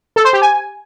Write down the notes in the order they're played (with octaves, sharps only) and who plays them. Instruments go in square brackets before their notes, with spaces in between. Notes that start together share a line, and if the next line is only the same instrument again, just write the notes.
[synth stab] A4
C5
G4
G#5